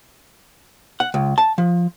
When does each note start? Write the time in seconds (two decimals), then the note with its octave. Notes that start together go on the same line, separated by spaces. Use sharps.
1.00 F#5
1.14 C#2
1.38 A5
1.58 F3